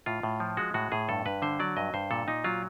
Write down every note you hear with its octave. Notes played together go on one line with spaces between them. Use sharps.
A2 F4
A2
F3
G#3 F#4
A2 F#4
A2 G#4
G2 A4
G2 B4
D3 C5
F#3 D5
G2 D#5
G2 C5
A#2 A4
A#2 D#4
F#3 F4